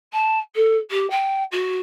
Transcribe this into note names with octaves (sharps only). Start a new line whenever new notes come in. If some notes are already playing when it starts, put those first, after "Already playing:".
A5
A4
G4
G5
F#4